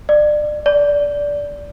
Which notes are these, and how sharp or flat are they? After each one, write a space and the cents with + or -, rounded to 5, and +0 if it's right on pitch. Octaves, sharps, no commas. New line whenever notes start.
D5 +30
D5 -15